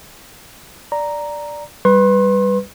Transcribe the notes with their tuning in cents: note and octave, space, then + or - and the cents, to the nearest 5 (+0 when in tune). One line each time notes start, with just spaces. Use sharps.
D5 +0 A#5 +0
G3 +0 B4 +5 C6 +35